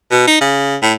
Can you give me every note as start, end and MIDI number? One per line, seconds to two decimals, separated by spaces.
0.11 0.24 47
0.27 0.37 63
0.41 0.77 49
0.83 0.94 45